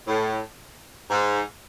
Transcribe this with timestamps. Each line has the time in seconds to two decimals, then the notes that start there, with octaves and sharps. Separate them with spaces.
0.07 A2
1.11 G#2